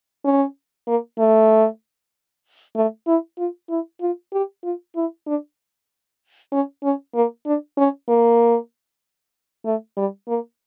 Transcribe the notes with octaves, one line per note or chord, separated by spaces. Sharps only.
C#4
A#3
A3
A3
E4
F4
E4
F4
G4
F4
E4
D4
C#4
C#4
A#3
D4
C#4
A#3
A3
G3
A#3